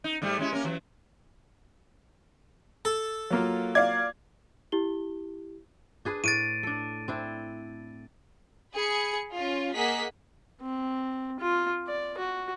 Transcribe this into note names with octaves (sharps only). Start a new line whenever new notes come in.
D#4
G#2 G3 A3
G#3 C#4 E4
A#3 C#4 A#4
E3 F#3
A4
F#3 A#3 F4
D5 F5 G#6
E4 G4 G7
D4 G#4 B4
A2 A6 D7 D#7
D4 A4
C4 D4 E4
G#4 B5 C#7
C#4 F4
A#3 G#4 D#5 F#5 B6
C4
F4
D5
F#4